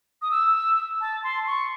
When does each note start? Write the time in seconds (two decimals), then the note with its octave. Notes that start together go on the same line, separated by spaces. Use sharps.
0.22 D#6
0.31 E6
1.01 A5
1.24 C6
1.47 C#6